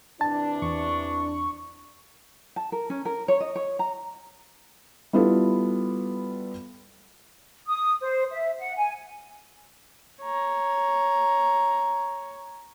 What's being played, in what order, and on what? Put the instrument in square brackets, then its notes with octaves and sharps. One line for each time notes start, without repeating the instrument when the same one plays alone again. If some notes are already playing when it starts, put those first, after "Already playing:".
[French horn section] C3 E3 D4 [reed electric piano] A5
[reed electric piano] E2 [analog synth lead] C#6
[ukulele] A5
A#4
C#4
A#4
C#5
D#5
C#5
A#5
[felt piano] G3 B3 E4 F4 A4
[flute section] D#6
C5
E5
F#5
G#5
[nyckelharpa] C#5 A#5